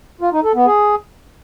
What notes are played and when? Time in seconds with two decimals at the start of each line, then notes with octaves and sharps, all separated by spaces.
0.21 F4
0.33 D#4
0.44 A4
0.55 B3
0.66 G#4